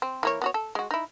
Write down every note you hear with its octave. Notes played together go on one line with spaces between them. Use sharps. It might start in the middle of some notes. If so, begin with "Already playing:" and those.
C4
E3 A#3 C#5
B3 F#4 C#5
A4
G#3 F#4
D#4 E4